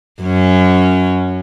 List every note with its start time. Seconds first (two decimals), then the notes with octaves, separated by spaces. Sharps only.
0.22 F#2 C#4